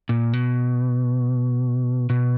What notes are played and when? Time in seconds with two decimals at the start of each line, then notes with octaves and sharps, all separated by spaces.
0.09 A#2
0.33 B2
2.10 B2